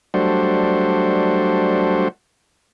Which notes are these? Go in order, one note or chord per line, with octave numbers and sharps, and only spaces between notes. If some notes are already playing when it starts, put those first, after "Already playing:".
F#3 G3 A3 D4 F#4 C5